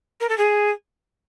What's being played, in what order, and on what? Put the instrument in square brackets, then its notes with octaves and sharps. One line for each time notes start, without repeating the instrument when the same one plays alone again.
[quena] A#4
A4
G#4